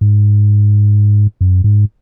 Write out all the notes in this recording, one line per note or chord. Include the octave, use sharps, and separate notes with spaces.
G#2
F#2
G#2